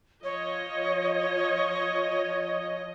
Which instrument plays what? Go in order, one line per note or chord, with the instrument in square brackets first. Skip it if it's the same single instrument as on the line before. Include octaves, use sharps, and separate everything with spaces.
[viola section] F3 D#5 [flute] C#5